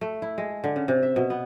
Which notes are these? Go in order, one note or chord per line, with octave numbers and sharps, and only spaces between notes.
A3
E4
G#3
D3
C#3
C3
E5
B2
B3